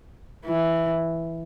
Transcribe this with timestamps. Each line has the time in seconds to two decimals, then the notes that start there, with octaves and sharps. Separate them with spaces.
0.46 E3